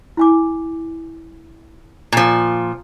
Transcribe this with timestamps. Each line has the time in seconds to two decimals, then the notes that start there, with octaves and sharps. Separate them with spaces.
0.17 E4 G#5 D6
2.12 A#2 F3